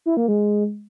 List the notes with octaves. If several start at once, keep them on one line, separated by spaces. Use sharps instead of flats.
E4
A#3
G#3